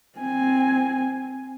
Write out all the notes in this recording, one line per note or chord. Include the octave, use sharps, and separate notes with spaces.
C4 G#5